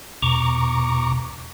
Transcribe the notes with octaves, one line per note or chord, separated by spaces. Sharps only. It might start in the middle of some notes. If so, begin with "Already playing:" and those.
E2 B2 A#5 C#6 D6